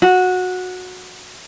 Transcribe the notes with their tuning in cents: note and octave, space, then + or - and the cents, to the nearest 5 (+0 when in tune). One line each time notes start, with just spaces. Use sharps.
F#4 -15